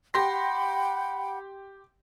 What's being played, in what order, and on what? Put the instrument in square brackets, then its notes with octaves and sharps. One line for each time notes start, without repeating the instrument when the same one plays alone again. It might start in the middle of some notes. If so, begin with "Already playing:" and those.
[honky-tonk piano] G4 C6 A#6 [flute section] F#5 G5 B5